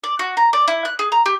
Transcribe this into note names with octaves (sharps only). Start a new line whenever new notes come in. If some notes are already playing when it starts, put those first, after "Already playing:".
D5
F#4
A#5
D5
E4
F#6
G#4
A#5
G4